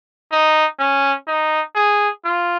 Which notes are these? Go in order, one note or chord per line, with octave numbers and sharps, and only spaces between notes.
D#4
C#4
D#4
G#4
F4